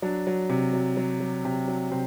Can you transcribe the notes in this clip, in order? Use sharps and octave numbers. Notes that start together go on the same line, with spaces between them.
F#3 D4
F#3
C3
F#3
F#3
F#3
C3
F#3
C3 C4